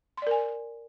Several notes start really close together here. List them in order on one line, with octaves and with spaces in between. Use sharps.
C6 D5 A#4 G#5